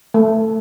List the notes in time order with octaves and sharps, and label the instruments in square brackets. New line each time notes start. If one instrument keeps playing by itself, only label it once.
[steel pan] A3